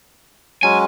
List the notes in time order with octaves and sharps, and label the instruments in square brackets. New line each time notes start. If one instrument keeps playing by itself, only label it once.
[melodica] F#3 G#3 C#4 [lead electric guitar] G#5